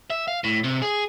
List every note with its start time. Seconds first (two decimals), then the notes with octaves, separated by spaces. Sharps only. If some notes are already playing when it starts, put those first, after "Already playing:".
0.10 E5
0.28 F5
0.44 A2
0.64 C3
0.82 G#4